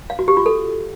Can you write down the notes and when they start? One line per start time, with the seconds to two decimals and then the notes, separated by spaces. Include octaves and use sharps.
0.10 F5
0.19 F#4
0.28 G4
0.37 F4
0.46 A4